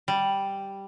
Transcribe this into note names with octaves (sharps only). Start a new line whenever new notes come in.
G3